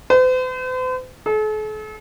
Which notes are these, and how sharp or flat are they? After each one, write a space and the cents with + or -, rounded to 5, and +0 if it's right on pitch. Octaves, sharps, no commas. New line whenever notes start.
C5 -45
A4 -45